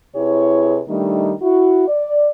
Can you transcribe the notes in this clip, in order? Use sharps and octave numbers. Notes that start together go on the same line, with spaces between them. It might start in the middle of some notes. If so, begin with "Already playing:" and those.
C3 E4 G#4 B4 C#5
D#3 G3 A3 D4 D#4
E4 F#4
D5